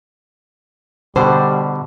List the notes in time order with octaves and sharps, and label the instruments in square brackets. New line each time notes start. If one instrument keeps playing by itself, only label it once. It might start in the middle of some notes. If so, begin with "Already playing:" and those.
[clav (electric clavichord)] B2 D3 [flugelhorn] G3 [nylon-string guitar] C5